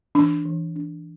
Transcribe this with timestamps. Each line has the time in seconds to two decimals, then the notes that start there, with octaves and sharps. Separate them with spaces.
0.15 E3 D4
0.45 E3
0.76 D4